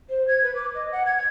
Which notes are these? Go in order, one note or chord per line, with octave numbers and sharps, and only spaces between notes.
C5
G#6
B4
D6
D#5
F#5
G#6
G#6